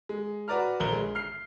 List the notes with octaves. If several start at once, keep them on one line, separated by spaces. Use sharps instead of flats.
G#3
F#4 B4 D5 A#5 F6
A#1 A#4 G7
G#3
F6 C7